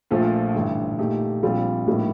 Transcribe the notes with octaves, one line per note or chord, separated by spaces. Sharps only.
A#1 A#2 F3 A3
A1 G2 D3
A#2 A3 D#4 G4
A#1 A#2 G3 C4 F4
A#1 A2 G3 A#3 D#4